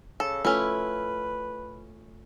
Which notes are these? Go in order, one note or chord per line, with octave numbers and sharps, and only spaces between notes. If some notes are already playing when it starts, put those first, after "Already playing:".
C#3 A4
A3 C#4 E4 F4 A4 B4